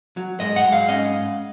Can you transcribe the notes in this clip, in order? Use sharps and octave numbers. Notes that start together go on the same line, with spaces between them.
F#3
G#2 D#5
F#5
G#2
F5
C#4 D#5